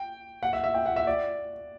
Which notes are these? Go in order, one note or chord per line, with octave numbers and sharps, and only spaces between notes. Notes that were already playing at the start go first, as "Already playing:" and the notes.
Already playing: G5
F#5
E5
E5
G5
F#5
E5
D5